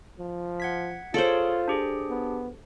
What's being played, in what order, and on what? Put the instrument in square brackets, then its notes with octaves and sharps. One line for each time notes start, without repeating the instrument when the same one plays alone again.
[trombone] F3
[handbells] F#5 G#6 B6
[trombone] F4 [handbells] G#4 C#5 [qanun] A4 C5
[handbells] D4 G4 G#4
[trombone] B3